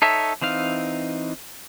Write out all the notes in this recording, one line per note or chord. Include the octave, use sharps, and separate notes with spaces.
D#4 A4 C#5 E5
E3 C4 D#4 F5